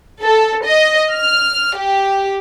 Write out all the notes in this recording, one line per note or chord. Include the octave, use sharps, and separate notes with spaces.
A4
D#5
F6
G4